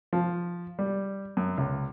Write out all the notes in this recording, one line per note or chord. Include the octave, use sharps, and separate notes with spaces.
F3
G3
F#2
C#2